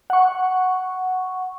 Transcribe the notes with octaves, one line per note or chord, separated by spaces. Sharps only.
F#5 C#6